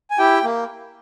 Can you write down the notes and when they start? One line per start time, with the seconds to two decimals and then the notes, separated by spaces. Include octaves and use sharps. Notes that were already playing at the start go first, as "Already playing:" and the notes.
0.11 G#5
0.18 E4 G4 G5
0.44 A#3